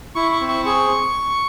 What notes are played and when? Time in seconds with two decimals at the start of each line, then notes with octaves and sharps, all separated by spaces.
0.15 E4 C#6
0.32 C#6
0.41 C4
0.49 C#6
0.65 G#4 C#6